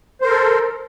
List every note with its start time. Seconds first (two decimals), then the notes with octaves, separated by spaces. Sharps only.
0.21 C5
0.25 A#4
0.29 A4